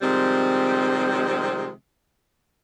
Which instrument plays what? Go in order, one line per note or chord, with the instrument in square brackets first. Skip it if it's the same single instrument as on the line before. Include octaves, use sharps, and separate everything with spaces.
[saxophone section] C3 D#3 F3 G3 G#3 C4